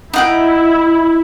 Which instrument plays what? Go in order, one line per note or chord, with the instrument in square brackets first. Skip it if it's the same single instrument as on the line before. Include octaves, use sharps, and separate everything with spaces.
[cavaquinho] D#4 F#5 G5 [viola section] E4